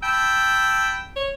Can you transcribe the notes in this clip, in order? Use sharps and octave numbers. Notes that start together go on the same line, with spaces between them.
G5 A5 B5 E6
C#5